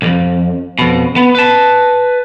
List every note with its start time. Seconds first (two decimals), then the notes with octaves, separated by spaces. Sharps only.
0.02 C2 F2
0.79 F2 B2
1.16 B3
1.35 B4 A5